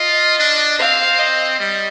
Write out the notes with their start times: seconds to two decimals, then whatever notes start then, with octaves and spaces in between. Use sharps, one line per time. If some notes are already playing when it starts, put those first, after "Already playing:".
Already playing: F4 D#5
0.39 D4
0.79 C4 F5
1.19 D#5
1.59 G3 D#5